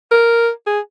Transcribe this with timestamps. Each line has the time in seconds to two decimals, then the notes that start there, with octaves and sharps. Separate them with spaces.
0.11 A#4
0.66 G#4